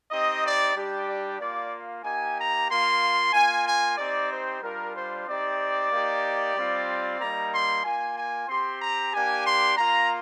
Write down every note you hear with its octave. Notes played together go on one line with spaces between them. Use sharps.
C4 D#4 G4 D#5
D5
G3 D4 G4
D5
A#3 F4 D5
A#3 D#4 G4 G#5
A#5
A#3 F4 C6
A#3 F4 G#5
G#5
C4 D#4 G4 D5
C5
G3 D4 F4 A#4
C5
C4 D#4 G4 D5
A#3 D#4 G4
G3 C4 F4
G3 A#3 D#4 A#5
C6
A#3 F4 G#5
G#5
C4 G4 C6
A#5
A#3 D4 G4 G#5
C6
A#3 F4 A#5